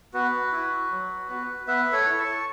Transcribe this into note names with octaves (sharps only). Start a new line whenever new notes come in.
B3 F#4 B4
E4
F#3
B3 F#4
B3 B4 E5
A4 C#5
E4
A5 C#6